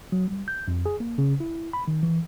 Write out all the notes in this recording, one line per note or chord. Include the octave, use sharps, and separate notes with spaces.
F#3
G3
G6
F2
G#4
A#3
C#3
E4
B5
D#3
E3